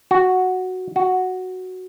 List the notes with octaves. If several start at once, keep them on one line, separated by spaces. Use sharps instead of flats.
F#4
F#4